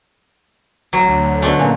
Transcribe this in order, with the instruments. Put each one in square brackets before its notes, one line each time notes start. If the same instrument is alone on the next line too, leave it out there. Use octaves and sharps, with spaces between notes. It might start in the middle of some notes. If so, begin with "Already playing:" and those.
[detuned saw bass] A1 [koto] F#3
[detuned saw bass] D2
[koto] B2 D3 A3
[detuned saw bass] A#2 [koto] C#3